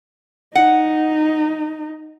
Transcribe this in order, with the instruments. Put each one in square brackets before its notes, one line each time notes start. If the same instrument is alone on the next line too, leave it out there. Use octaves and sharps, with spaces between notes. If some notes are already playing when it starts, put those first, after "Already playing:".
[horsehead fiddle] D#4 [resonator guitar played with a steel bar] F#5